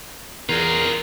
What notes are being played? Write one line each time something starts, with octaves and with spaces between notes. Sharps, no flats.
E2 F4 G#4 A#4